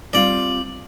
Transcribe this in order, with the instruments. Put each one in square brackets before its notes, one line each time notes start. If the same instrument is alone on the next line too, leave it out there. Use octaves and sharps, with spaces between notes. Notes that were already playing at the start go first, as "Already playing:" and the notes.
[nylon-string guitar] G3 C4 F4 [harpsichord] D5